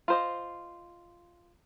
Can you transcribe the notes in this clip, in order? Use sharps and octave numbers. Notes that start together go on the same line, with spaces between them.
F4 C5 D#5